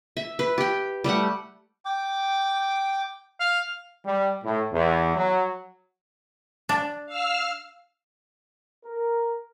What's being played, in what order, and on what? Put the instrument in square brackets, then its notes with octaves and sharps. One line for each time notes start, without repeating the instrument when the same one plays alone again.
[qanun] E5
B4
G4 G5
G3 A3 G4 F#5
[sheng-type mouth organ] G5 D6
[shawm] F5
[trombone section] G3
A2
E2
F#3
[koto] D4
[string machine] F5 E6 F6
[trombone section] A#4